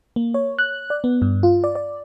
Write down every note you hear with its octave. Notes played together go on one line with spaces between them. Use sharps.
A#3
C#5
F#6
D5
B3
G2
F4
D5
D5